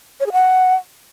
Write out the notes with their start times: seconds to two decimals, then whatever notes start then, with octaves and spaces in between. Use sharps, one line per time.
0.20 C#5
0.26 G#4
0.32 F#5